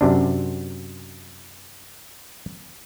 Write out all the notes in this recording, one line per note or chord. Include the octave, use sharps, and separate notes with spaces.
F#2 C3 D4